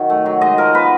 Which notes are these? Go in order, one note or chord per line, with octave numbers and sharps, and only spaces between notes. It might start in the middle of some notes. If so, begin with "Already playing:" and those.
Already playing: D#3 F#3
A3
F#3
G#3 D#5
F3 A#4
B3 B4